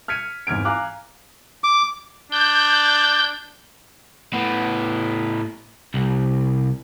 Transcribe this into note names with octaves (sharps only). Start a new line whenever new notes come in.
F6 G#6 B6 C#7 D#7
G#1 E2 F6 G#6 D7
F5 G#5 A#5 D6 F#6
D6
D4 G6
A2 B3
C2